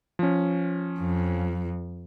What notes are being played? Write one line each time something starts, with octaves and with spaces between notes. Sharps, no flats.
F3 C#4
F2